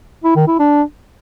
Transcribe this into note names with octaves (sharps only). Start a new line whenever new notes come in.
E4
D#3
E4
D4